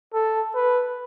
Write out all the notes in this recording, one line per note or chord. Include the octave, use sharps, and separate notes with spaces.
A4
B4